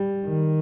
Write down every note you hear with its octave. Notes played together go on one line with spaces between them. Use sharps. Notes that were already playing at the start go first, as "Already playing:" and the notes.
Already playing: G3
D#3